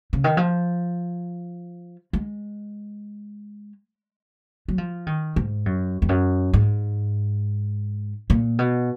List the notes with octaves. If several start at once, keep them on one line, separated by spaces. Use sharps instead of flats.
C#3
D#3
F3
G#3
F#3
F3
D#3
G#2
F#2
F2
F#2
G#2
A#2
B2